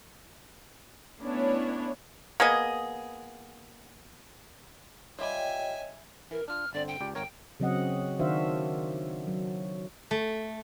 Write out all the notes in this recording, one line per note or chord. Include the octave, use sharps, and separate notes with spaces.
A3 B3 C#4 D4 E4 C#5
A#3 B3 G#4 D#5
G3 F4 C#5 D#5 E5 G5 G#5
E3 A#4
D4 F4 F6
G1 D3 C4 D5
G5
C#2 G4 D5
G#1 A#4 C#5 G5
C#3 F#3 C4 D#5 F#5
D#3 D4 F#4 C5 E5 F5
F#3
A3